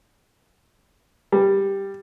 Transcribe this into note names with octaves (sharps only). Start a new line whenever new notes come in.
G3